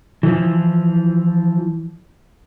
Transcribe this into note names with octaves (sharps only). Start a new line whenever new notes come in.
E3 F3